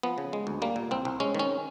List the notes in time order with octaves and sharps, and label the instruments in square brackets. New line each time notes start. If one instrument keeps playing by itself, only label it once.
[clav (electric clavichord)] F3 B3
C#3
G#3
D2
G3 A#3
A#2
C2 C4
C2
G#3 C#4
D#3 C#4